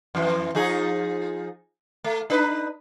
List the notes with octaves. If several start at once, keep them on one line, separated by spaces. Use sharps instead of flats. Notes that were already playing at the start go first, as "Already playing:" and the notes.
F2 E3
F3 D#4 G#4
A3
D4 D#4 B4